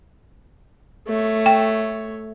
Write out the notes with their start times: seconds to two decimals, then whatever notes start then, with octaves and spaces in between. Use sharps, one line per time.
1.07 A3 C#5
1.46 G5